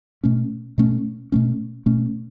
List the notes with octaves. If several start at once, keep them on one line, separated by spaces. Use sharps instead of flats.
B2 A3 C#4
B2 A3 C#4
B2 A3 C#4
B2 A3 C#4